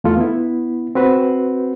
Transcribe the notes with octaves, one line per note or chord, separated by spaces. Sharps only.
E2 A3 F4 A4
B3 E4
C4 F#4 B4 C5